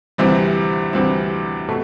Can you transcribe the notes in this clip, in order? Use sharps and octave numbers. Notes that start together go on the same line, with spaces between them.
D2 C3 E3 G3 C4
D2 C3 E3 G3 C4
B2 A3